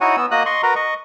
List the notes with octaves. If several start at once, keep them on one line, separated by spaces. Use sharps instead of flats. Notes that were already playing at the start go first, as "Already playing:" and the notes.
D#4 E4 F#4 C#5 F#5 G#5
B3 E6
A#3 F#4 D#5 D#6 F#6
D#5 C6 C#6
F#4 A#4 B4 A#5
D#5 C#6